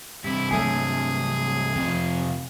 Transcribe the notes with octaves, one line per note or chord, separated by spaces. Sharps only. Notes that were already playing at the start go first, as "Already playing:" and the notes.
G2 C3 E4
F#3 A3 G#4 G#5
F2 C3 F4